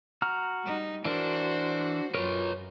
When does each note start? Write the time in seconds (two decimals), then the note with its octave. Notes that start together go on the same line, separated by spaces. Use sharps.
0.22 F#4 A#5 F6
0.63 G3 D#4
1.05 E3 D4 F#4 A#4 C5
2.15 F#2 F4 A#4 B4 C#5